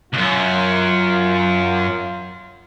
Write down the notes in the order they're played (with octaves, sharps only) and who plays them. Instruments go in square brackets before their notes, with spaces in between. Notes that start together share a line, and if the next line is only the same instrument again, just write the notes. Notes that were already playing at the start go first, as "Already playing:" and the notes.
[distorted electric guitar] C#2 F#2 [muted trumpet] F4